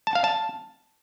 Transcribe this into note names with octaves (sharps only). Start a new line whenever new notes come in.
A5
F5
A5